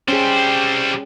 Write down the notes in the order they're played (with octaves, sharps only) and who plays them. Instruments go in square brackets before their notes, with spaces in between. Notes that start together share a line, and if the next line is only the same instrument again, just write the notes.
[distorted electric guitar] G3 C5 [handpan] C#4 G#4 [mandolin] G4